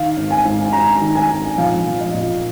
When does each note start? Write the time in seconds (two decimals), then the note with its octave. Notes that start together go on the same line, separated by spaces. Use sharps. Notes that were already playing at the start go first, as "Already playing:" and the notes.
Already playing: D#3 F5
0.16 G#1
0.31 G#5
0.45 G#2
0.73 G#1 A#5
1.01 D#3
1.15 G#5
1.30 G#1
1.58 A#1 F5
1.86 A#1
2.01 D#5
2.14 A#2